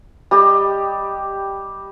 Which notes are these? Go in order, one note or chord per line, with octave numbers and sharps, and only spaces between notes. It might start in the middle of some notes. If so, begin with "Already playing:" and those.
G3 G4 D#5